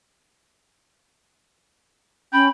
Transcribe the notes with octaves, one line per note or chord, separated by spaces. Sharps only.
C#4 G5 B5